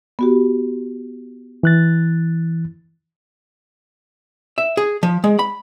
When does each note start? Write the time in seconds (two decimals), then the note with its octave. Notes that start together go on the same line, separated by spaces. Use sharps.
0.19 B3 F#4 G4
1.63 E3 F#6 A6
4.58 E5
4.77 G#4
5.03 F3
5.24 G#3
5.39 B5